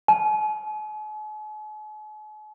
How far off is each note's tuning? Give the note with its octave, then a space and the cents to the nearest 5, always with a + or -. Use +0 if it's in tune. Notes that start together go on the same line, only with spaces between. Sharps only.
G#5 +45